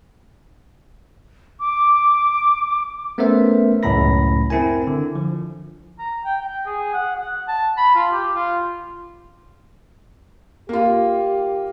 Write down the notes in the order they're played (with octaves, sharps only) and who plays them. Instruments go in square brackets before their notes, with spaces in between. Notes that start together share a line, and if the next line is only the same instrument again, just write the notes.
[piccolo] D6
[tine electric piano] A3 B3 C#4 A#4 C5 E5
C#2 F#2 A2 A#5 B5 A#6
C4 E4 A#4 G#5
D3
F3
[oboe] A#5
G5
G5
G#4
F#5
F#5
A5
B5
F4
G4
F4
[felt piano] A#3 F4 [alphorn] G4